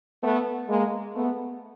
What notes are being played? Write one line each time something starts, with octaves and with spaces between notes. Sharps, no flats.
A3 B3
G#3 A#3
A3 B3